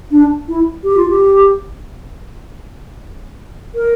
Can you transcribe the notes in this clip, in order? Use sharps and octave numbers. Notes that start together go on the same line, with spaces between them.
D4
E4
G4
F4
G4
A#4